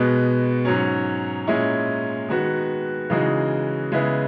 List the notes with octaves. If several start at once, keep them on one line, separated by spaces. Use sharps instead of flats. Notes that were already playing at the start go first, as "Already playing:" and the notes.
Already playing: B2 G#3 B3
G#2 F#3 C#4
A#2 G#3 C#4 E4
D#3 G#3 B3 F#4
C#3 E3 G#3 D#4 F#4
C#3 G#3 B3 E4